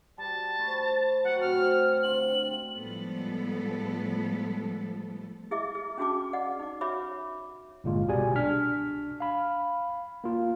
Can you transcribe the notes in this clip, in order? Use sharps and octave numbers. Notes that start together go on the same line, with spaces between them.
G3 A5
A3 B4 C5
F#3 F#5 G5
A2 C3 F6
D3 C4 F4 F#7
A2 F3 G3 G#3 B3 A4
E4 G#4 D#5 E5 D6
G#4
C#4 D4 F#4 G#4 A5 D6
D5 D#5 F#5
D#4 D6
F#4 C#5 E5 B5 D6
G1 A#2 G#3 F4
C2 B2 G4 G#4 D5 G#5
D4 F6 B6
F5 B5
A#3 F4